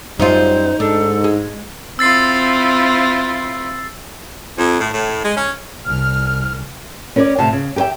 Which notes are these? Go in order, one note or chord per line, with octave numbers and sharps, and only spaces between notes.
F#2 G3 D#4 F4 C5
G#2 D4 A4
G#3
C4 E4 F4 E6 A6 C7
F2
A2
A2
G#3
C#4
C2 F6
C#4 A#4 B4 C#5 D5
A2 C3 G4 F5 A5
C#3
G4 A#4 C#5 E5 G5